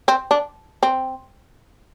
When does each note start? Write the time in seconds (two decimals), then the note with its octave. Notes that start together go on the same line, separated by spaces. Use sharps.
0.08 C4
0.31 D4
0.83 C4